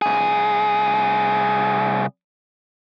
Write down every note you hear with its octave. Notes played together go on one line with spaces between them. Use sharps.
C2 G#4